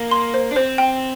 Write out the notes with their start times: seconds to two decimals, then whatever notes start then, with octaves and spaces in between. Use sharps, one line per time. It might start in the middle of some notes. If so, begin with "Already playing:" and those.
Already playing: A#3
0.11 C6
0.34 C5
0.51 D4
0.56 C4 C5
0.78 G5